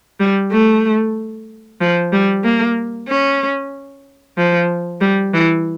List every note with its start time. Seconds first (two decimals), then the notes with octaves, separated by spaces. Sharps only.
0.20 G3
0.51 A3
1.81 F3
2.13 G3
2.44 A#3
3.08 C#4
4.37 F3
5.01 G3
5.34 E3